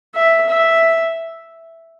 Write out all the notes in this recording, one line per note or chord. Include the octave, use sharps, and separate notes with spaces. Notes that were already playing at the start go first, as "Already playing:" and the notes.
E5
E5